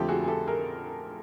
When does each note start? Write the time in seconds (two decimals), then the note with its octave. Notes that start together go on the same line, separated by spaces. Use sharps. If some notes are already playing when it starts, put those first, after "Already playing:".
Already playing: F2 D3 F3 A3 C4 G4 A4
0.09 F#4 G#4
0.24 G#4
0.28 G4 A4
0.47 G#4 A#4